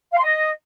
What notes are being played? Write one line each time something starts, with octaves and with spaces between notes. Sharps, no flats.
F5
C6
D#5